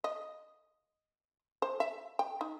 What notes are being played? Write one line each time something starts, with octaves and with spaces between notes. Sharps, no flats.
D#5
C5
E5
G5
D#4